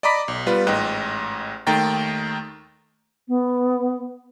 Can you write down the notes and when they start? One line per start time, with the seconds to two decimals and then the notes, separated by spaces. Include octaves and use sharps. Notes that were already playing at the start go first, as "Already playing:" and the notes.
0.03 D5 D#5 A#5 B5 D6 B6
0.28 B1
0.46 G3 B3 F4 B4
0.67 A1 G#2 D#5 G5 F#6
1.67 D#2 D#3 A3 G5 A#5 A6
3.28 B3